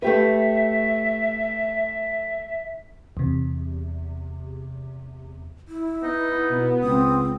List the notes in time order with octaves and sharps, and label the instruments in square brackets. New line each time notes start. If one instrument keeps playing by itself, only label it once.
[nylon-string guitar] A3 G4 B4 [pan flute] E5
[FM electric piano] E2 C3
[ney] E4
[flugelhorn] B3 [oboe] D#4
[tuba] B2
[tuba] C#2 [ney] C4 [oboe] D#6